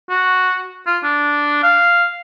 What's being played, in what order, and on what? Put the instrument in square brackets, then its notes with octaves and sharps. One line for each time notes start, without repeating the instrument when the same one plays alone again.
[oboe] F#4
F4
D4
F5